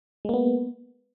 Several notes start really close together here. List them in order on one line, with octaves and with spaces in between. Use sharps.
G#3 A#3 B3